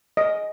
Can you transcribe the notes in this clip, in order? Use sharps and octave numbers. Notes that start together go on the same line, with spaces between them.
D#5